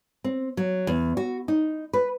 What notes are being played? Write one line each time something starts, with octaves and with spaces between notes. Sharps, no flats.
C4
F#3
E2
F#4
D#4
B4